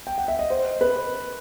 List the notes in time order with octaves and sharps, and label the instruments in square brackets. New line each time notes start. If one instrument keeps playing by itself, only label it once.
[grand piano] G5
F#5
E5
D#5
C5
B4